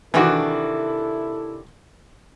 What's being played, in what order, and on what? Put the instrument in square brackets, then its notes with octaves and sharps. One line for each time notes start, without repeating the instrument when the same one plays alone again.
[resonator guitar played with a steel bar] C3 D#3 D4 [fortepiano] E3 F#4 [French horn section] E4 A4